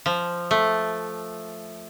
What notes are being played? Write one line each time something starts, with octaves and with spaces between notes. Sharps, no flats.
F3
A3